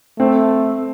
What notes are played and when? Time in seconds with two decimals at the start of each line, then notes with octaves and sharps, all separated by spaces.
0.19 A3 C4